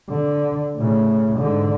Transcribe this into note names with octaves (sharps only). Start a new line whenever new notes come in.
D3
A2 C#3
G#2 D3